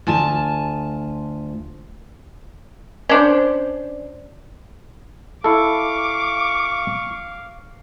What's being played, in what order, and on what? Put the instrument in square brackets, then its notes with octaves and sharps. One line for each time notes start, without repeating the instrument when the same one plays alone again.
[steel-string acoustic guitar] D2 F4 G#5 A5
[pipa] C#4 D4 C5
[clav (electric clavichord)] E4 A4 [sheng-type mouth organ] F5 [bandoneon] C#6 [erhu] D6